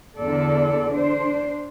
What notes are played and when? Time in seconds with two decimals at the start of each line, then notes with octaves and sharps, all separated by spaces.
0.18 E2 D3 A4 D5
0.91 D4 C5